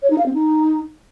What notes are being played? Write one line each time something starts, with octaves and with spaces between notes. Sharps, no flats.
C#5
D#4
F5
C4
D#4